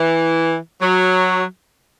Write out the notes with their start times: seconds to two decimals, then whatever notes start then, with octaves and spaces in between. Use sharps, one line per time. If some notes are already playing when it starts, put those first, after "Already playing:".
Already playing: E3
0.81 F#3